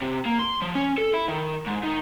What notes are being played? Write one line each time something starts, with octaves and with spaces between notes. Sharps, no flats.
C3
A#3
C6
F3
C#4
A4
E4
D#3
G#2
D#3